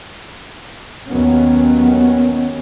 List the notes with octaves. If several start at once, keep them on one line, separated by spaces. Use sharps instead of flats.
D#2 D#3 F#3 B3 C#4